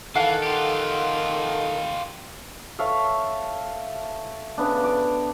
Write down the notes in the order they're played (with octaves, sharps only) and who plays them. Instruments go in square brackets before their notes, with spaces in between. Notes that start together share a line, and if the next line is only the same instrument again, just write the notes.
[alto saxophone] D#3 [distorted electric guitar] E3 [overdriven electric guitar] A4 [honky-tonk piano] F5 F#5 C7
[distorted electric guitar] F4 G4
[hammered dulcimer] A4 C#5 E5 F5
C#3 B3 D4
D6